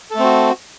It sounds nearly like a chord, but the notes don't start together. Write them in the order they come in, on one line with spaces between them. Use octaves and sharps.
A4 A3 C4 F#4